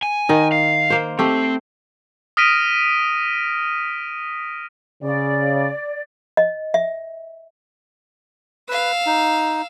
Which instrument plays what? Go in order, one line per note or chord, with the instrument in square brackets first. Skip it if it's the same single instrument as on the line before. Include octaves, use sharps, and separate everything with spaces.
[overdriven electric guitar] G#5
[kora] D#3 D#4
[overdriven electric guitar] F5
[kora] A#3 C5
[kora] A3 G4 [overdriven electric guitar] C4
[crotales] D#6 F6 A#6 B6 D7 D#7
[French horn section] C#3 [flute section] D5
[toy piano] D#5
E5
[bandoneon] B4 [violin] F5 E6
[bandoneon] D#4